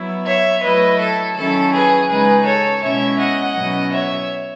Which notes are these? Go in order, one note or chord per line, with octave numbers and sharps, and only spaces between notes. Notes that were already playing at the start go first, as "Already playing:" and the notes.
Already playing: F#3 B3 E4
C#5 E5
F#3 A3 E4 B4 D#5
A4
D#3 F#3 C#4 E4 A4
G#4 B4
C#3 G#3 D#4 G#4 B4
A4 C#5
B2 G#3 C#4 E4 C#5 E5
D#5 F#5
B2 F#3 C#4 E4
C#5 E5